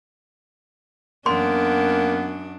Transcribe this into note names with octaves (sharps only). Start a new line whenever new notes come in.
F#2 A#3 B3 D4 C6